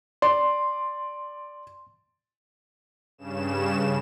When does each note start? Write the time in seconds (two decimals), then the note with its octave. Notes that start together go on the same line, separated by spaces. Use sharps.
0.22 D5 C6
3.18 G2 C#3 E7